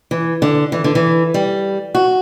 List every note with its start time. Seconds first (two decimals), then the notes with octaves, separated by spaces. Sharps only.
0.11 E3
0.42 D3
0.72 E3
0.84 D3
0.95 E3
1.34 G3
1.95 F#4